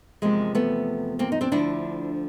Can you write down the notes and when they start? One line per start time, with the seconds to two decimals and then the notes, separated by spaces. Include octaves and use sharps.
0.22 E2 C3 F3 G#3 A#3
0.55 A3 B3
1.19 A#3 C4
1.32 D#4
1.41 C4 D4
1.52 D2 D3 F3 D4 E4